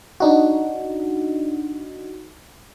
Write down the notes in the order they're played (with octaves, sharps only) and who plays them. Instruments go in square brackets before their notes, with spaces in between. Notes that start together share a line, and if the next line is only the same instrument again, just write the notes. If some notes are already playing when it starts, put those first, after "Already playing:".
[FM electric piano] D4 D#4 F#4